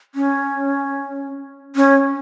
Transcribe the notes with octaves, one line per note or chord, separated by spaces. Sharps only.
C#4
C#4